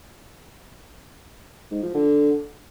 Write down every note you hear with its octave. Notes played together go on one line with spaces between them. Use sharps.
G#2
F3
D3